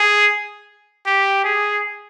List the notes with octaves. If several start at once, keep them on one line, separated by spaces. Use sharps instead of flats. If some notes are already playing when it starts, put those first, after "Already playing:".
Already playing: G#4
G4
G#4